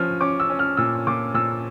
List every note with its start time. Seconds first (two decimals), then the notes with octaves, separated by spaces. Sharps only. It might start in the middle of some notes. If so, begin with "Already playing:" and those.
Already playing: F3 C#4 F6
0.21 C#4 D6
0.40 E6
0.50 C#4
0.59 F6
0.77 A#2 E6
1.07 A#2 D6
1.34 A#2 E6